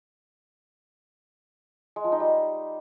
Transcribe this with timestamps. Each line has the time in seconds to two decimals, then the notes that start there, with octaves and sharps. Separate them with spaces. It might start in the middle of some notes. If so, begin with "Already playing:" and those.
1.96 G#3
2.04 F3
2.12 D#4
2.20 G3